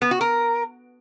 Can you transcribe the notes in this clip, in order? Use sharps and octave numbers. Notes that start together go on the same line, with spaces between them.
B3
F#4
A#4